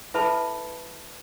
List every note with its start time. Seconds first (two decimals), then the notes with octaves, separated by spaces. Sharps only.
0.14 E4 A4 B4 E5 A5 B5